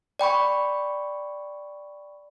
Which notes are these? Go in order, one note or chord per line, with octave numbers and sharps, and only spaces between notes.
D5 G5 B5 C#6